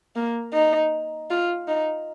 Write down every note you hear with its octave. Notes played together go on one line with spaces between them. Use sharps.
A#3
D#4
F4
D#4